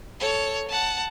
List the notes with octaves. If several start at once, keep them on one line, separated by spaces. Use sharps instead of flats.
A4 C#5
F#5 A5